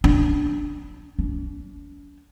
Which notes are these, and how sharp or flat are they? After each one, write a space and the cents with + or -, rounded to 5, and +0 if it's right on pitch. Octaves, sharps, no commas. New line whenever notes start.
D4 -5
D4 -45